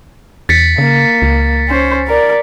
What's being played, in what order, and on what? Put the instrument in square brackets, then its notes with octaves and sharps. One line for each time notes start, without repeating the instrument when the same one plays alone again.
[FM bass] E2 [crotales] A6 B6 C#7
[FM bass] C#3 [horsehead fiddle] A#3
[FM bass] C#2
[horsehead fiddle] C#4 C5
A#4 D5